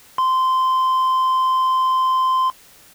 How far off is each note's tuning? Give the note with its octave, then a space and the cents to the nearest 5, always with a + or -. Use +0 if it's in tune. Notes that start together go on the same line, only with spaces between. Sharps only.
C6 -15